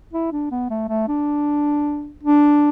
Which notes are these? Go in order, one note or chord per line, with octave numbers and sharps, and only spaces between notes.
E4
D4
B3
A3
A3
D4
D4